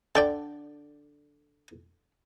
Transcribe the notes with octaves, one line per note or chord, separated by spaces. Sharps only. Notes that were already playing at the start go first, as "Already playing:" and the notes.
D3 D5 G5 A5